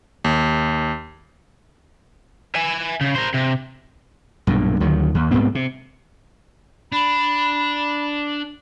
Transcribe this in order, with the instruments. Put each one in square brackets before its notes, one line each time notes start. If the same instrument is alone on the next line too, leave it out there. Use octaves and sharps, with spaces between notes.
[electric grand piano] D#2
[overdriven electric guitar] E5 G#5
C#3
A#4 C5
C3
[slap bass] B1 G2 A#2
D2 D#3 F#3
D#2
C2 G#2 B3 C4
C3
[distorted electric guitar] D4 [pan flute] B5